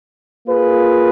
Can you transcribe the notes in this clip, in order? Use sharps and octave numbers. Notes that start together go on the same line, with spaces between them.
A#3 F4 G#4 B4